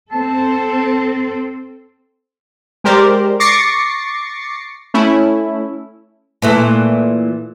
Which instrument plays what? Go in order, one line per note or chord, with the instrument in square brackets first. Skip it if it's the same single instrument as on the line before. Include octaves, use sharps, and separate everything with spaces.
[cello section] C4 A4 [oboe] A5
[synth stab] G#3 G4 A#4 C5 D5
C#6 D6 A6 A#6 C7 C#7
A3 C#4 E4
[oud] A#2 E3 A3